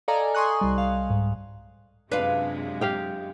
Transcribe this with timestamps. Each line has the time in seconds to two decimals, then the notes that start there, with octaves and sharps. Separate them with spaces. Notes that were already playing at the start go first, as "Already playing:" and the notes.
0.08 A4 D5 D#5 F5 G#5 A#5
0.35 G#5 C6 C#6 D#6 F#6
0.61 C2 G3
0.78 F5
1.10 G#2
2.12 F#2 C3 G#3 D4 F4 B4
2.81 G4 F5 G5